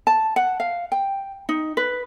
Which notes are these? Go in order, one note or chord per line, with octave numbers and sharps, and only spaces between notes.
A5
F#5
F5
G5
D#4
B4